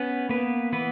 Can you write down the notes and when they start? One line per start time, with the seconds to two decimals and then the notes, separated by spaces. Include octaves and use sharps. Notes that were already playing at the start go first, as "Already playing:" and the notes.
Already playing: B3 C#4 B4
0.29 A#3 B3 B4
0.73 E3 B3 B4